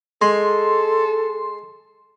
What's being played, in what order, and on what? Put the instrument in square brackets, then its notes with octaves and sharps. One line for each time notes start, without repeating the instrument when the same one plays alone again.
[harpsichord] G#3 [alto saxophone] A4 [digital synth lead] C6